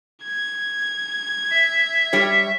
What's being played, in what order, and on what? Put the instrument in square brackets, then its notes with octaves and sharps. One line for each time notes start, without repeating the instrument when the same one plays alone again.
[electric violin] G#6
[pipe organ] E5
[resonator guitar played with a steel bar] G3 G4 C#5